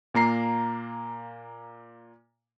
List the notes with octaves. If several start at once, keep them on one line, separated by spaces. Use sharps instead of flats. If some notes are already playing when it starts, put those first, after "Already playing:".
A#2 A#3 A#5 C7